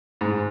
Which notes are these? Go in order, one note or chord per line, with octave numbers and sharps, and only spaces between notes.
G#2